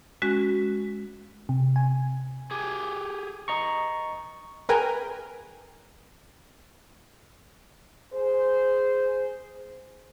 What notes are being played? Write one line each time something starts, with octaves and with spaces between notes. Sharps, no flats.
G#3 C#4 F#4
C3
G#5
G4 G#4
D#5 A#5 C#6
G#4 A#4 B4 G5 G#5 A#5
G#4 C5